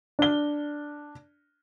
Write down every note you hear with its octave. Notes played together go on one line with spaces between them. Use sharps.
D4 G7